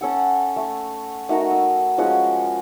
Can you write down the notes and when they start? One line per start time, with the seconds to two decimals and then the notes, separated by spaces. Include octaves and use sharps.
0.01 C#4 A4 F#5
0.56 A3
1.29 A3 D#4 F#4 A#4
1.51 D#5 E6
1.98 F3 G#3 C#4 F#4